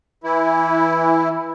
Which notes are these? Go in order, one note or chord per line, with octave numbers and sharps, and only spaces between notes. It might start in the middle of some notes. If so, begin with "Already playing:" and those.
E3 E4